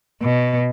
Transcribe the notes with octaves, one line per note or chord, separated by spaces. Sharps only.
B2